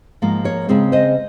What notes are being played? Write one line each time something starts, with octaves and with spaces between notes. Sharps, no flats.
G#2 F3 A#3
A#4 C#5
C#3 G#3 C4 G#4 C5
C5 D#5